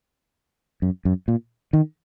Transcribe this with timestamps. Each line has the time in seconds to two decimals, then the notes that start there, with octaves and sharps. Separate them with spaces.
0.82 F#2
1.05 F#2
1.28 A#2
1.73 D#3